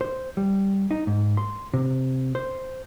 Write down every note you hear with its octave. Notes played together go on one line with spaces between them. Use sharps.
C5
G3
D#4
G#2
C6
C3
C5